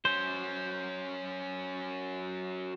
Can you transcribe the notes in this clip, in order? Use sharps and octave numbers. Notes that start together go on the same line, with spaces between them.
F#3 C#4 C5